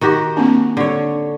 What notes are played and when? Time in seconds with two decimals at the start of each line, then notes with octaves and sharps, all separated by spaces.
0.01 D#3 F#4 G4
0.37 A#3 C4 D4
0.77 D3 C#5